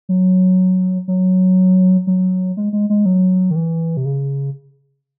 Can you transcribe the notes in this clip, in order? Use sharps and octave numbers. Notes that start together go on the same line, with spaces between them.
F#3
F#3
F#3
G#3
G#3
G#3
F#3
D#3
E3
C3
C#3